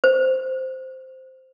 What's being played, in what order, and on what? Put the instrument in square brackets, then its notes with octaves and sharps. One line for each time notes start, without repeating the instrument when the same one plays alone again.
[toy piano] C5